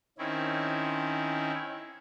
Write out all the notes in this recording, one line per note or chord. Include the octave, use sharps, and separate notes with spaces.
D#3 C4 C#4 E4